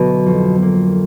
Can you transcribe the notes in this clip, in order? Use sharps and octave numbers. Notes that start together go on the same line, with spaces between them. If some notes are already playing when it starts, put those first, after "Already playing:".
Already playing: D2 B2 F#3
F2
A#3